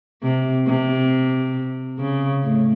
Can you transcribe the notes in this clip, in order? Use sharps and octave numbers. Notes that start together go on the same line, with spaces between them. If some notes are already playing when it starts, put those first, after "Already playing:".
C3
C3
C#3
A2